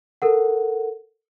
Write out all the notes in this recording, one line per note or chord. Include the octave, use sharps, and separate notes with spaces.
A4 A#4 F#5